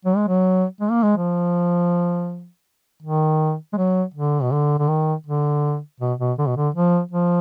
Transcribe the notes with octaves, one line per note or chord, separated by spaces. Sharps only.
F#3
G#3
F#3
G#3
A#3
G#3
F3
D#3
G#3
F#3
D3
B2
D3
D3
D#3
D3
B2
B2
D3
B2
D3
F3
F3